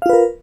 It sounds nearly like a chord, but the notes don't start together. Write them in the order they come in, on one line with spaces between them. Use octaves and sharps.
F5 F4 B4 A#4